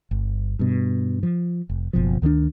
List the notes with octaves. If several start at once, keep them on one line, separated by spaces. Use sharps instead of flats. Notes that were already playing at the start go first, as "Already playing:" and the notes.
G1
G2 B2
F3
F1
F#1 B2 F3
D2 D#3 G3 D4